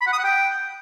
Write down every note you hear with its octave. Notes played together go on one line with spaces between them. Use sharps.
B5
F#5
D#6
F#5
G5